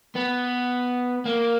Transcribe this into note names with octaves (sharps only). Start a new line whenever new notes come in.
B3
A#3